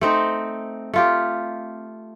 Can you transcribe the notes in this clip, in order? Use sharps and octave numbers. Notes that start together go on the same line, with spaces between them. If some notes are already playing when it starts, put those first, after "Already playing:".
A3 C4 D#4
A3 F4 G4